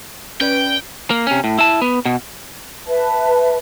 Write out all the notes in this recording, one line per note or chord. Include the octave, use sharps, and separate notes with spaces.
C#4 B4 D5 G5
A#3
C3 C#4
A2
E4 A5
B3
B2
B4 E5 A5